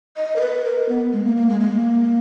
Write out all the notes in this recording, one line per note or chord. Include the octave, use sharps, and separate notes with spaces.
D#5
A#4
B4
A#4
B3
G#3
A#3
A#3
G#3
G#3
A#3